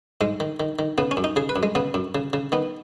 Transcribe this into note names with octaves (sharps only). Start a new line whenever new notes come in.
G#2 G#3
D#3
D#3
D#3
C#3 B3
C#4
F#2
D#4
C#3 G#4
B4
F#2
G#3
C#3 B3
F#2
C#3
C#3
D#3 B3